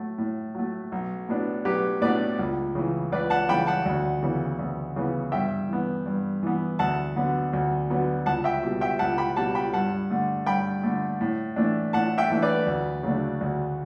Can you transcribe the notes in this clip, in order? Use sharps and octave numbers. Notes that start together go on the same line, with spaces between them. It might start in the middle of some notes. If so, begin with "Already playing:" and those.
Already playing: A2 F#3 A3
A2
F#3 A3
B1
A2 F#3 B3 D4
B1 G4 B4
A2 F#3 B3 D4 B4 D5
C#2
C#3 E3
C#2 B4 D5
F#5 A5
C#3 E3 G5 B5
F#5 A5
D2
C#3 E3 B3
D2
C#3 E3 B3
G2 E5 G5
E3 B3
G2
E3 B3
D2 F#5 A5
D3 F#3 B3
D2
D3 F#3 B3
C#2 F#5 A5
E5 G5
B2 G3
E5 G5
C#2 F#5 A5
G5 B5
B2 G3 F#5 A5
G5 B5
G2 F#5 A5
D3 A3
G2 G5 B5
D3 A3
A2
E3 A3 D4
A2 F#5 A5
E5 G5
E3 A3 D4
B4 D5
D2
C#3 F#3 A3 D4
D2